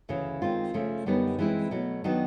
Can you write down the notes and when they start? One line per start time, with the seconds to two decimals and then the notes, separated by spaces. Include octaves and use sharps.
0.09 D2 C#3 E3
0.42 D#3 G#3 C4 F4
0.74 C#3 F3 A3
1.06 F#2 D3 G3 B3 D#4
1.39 E3 G#3 C4 E4
1.71 B2 F#3 A3
2.04 D#3 F#3 B3 D4